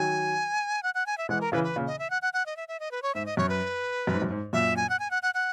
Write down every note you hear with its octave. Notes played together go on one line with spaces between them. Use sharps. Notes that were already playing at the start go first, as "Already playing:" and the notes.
Already playing: D#3 F#3 G#5
F#5
F#5
G#5
E5
E3 G#3 F#5
A#4
C#3 E3 B4
B4
A#2 C#3
D#5
E5
F#5
F#5
F#5
D#5
E5
E5
D#5
B4
C#5
G#2 E5
D#5
F#2 C#5
B4
F#2
G#2
F#2
G#2
F#2 A#2 E5
G#5
F#5
G#5
F#5
F#5
F#5